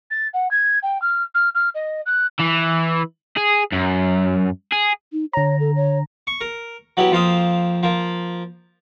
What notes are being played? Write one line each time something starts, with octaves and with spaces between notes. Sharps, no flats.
A6
F#5
G#6
G5
F6
F6
F6
D#5
F#6
E3
G#4
F#2
G#4
D#4
D3 C#5 A#5
A4
C#5
C#6
A#4
F#3 B3 E4 G4
F2 A#3 C5 F5 D#6
F3 A#3